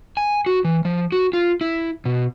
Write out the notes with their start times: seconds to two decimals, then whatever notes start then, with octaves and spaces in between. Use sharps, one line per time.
0.17 G#5
0.46 F#4
0.65 E3
0.85 F3
1.12 F#4
1.33 F4
1.61 E4
2.05 B2